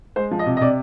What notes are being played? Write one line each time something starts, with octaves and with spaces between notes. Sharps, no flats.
G#3 C5
F3
D#5
C3
D#5
C3 D5